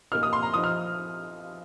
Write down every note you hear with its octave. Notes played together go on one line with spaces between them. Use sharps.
A#2 A#3 D#4 F6
D#6
C6
A#5
F3 D#4 D#6
F6